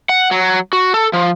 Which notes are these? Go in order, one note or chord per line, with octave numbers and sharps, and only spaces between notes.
F#5
F#3
F#4
A4
F3